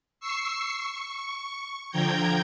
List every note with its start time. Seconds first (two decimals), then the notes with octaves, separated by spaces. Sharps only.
0.20 C#6 E6 C7
0.77 C#6
1.90 D3 F3 G5 A#5 G6 G#6